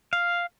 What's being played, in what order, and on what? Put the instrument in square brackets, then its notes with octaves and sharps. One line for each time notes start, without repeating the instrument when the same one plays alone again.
[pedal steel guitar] F5